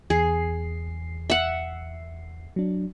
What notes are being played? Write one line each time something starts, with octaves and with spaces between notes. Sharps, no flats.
E2 G#4 C7
E5 F#5
F#3 D4